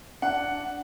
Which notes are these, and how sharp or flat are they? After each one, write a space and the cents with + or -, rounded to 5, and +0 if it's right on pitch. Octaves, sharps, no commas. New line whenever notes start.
D4 -10 F#5 +0